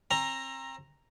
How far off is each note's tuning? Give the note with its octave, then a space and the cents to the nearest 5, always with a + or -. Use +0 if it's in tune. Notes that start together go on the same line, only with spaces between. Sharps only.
C4 +35 A#5 +0